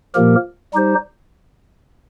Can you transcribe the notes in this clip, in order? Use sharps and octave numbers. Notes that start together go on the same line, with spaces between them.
A#2 F3 A#3 G4 A#4
G3 D#4 G4 C5